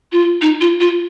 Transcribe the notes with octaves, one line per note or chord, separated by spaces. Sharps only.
F4
D#4
F4
F4